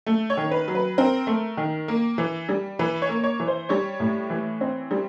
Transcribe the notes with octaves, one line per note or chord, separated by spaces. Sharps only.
A3
C#5
D#3
B4
F#3
B4
C4 A#4
A3
D#3
A#3
E3
G3
E3 B4
C#5
A#3
C#5
E3
C5
G3 C#5
A2
E3
C4
G3